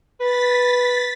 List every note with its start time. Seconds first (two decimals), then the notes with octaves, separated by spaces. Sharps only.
0.20 B4 A6 B6